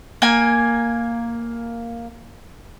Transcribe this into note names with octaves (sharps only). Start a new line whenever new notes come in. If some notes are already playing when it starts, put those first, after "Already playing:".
A#3 G#5